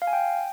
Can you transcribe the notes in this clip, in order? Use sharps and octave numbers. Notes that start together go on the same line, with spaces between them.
F5
G#5
G5